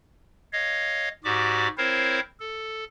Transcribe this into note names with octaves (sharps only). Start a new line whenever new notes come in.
C#5 D#5 F5
G#2 F#4 G4 D5 D6
C4 E4 A#4 C5 C#5 F5
A4